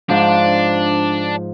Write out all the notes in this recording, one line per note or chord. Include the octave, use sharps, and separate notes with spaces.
G#2 F3 D4